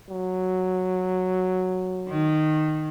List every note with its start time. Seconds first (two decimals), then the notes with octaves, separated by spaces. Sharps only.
0.10 F#3
2.08 D#3